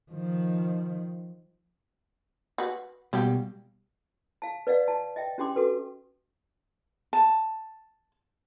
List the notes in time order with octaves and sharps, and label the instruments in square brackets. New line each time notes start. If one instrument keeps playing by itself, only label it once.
[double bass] D#3 F3
[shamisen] F#4 B4
[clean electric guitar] B2 G3 [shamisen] A#3 F#4 G4
[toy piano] F5 A5
B4 D5 D#5 F5 F#5
A5
D#5 E5 G5
C#4 D4 G4 G5 C6 D6
F#4 A4 B4
[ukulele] A5